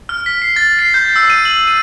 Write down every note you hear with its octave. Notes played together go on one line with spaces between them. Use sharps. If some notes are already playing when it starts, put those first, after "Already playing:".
F6
B6
C7
A6
C7
G6
E6
D#7
F#7
D#7